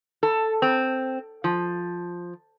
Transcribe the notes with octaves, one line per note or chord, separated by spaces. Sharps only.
A4
C4
F3